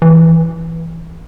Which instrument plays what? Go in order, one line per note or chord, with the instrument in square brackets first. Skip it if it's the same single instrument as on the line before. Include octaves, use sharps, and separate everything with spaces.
[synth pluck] E3